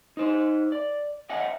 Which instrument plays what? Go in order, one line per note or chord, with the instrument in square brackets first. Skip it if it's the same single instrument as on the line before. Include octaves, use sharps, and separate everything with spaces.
[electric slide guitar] D#4 C5
D5
D#5 E5 F#5 G#5